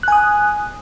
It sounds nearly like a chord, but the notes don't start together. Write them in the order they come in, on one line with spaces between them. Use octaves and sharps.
F#6 G#5 D#6